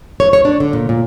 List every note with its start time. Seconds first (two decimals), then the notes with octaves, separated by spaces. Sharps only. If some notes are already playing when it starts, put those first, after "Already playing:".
0.20 C#5
0.33 C#5
0.45 D4
0.60 D3
0.73 A#2
0.89 A#2